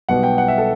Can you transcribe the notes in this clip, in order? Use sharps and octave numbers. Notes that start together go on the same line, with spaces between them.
B1 B2 G3 B3 F#5
G5
F#5
E5
A4